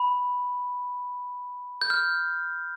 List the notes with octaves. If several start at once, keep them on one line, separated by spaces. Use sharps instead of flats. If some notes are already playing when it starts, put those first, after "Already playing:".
Already playing: B5
G6
F6